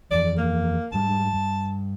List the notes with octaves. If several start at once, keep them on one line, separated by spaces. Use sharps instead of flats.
F2 E3 D5
A#3
G#2 G3 D4 A5
G2